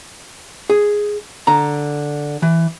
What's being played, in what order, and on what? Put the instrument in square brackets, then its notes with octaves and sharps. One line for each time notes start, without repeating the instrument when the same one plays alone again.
[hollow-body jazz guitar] G#4
D3 A#5
E3